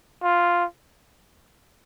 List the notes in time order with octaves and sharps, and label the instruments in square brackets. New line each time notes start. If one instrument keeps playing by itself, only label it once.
[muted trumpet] F4